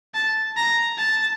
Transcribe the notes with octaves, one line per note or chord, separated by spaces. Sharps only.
A5
A#5
A5